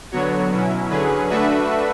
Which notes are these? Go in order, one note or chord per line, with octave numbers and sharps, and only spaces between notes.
D3 F#3 B3 F#4 C#5
B2 F#3 C#4 E4
D3 F#3 C#4 G#4 B4
A3 D4 F#4 B4 E5